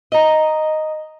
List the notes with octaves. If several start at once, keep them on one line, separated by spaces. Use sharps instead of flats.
D#5 A#5